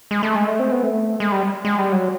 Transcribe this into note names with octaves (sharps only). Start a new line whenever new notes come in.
G#3
A3
G#3
A3
C4
B3
A3
G#3
G3
G#3
G3
F#3